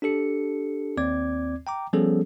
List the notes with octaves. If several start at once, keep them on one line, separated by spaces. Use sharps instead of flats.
D4 G4 A4 C#7
D#2 C4 D5 D6 G#6
G5 A#5 D6
F3 G3 B3 C#4 G#4 A4